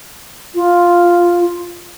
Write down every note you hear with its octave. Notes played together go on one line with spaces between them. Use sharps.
F4